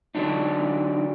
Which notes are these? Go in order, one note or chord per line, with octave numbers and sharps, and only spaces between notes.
D3 F#3 D4 D#4